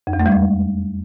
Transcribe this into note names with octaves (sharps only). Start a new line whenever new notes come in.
F2
E2
A3
G3
G#3